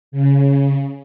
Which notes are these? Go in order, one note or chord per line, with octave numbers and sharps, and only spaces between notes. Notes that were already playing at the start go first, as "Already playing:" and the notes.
C#3